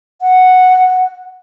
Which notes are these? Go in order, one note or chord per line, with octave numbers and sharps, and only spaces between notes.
F#5